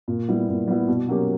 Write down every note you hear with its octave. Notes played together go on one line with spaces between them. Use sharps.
A#2
G3 B3 E4
A#2
G3 B3 E4
B2
F#3 A#3 C#4 G4